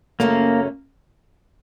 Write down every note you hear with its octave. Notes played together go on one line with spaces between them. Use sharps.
F#2 C#3 F#3 A3 A#3 C#4